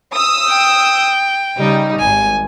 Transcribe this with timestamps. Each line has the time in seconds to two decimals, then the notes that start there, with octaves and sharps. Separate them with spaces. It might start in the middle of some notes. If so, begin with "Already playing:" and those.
0.12 D#6 E6
0.49 G5
1.57 C#3 G3 D#4
1.99 G#1 G#5